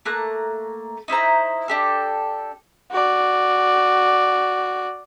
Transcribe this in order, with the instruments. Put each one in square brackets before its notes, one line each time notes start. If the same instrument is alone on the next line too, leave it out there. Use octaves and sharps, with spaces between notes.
[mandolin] A3 A#3 A#5 F#6
D#4 E4 C5 A#5
D4 G4 A4
[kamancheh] F#4 D5